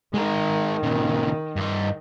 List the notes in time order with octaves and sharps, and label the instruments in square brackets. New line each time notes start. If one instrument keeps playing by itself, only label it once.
[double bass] D#3 [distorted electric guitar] G#3 A#4
[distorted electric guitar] A#2 C#3
G2 D#5